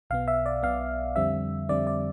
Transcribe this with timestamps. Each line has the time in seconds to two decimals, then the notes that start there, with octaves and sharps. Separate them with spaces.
0.10 B1 B2 B3 F5
0.28 E5
0.46 D5
0.63 B1 B2 B3 F5
1.16 F2 D3 G3 C4 E5
1.69 F2 D3 G3 C4 D5
1.87 D5